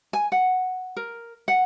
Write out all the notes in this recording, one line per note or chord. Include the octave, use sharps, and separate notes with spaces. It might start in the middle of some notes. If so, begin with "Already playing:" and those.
G#5
F#5
A#4
F#5